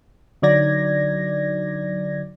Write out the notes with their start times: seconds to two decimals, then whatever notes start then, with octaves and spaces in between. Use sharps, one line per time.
0.42 D3 F#3 D#4 D5 G#6 A#6